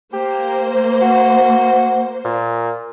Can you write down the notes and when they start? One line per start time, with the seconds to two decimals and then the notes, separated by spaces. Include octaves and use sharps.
0.13 A#3 G4 C5
1.02 F#4
2.25 A#2